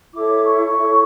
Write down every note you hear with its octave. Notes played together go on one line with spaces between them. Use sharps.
E4 A4 C#5 D6
C#6
E4 A4 C#5